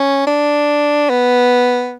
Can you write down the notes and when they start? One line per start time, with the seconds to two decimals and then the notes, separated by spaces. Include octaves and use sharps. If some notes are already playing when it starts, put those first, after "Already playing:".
Already playing: C#4
0.27 D4
1.10 B3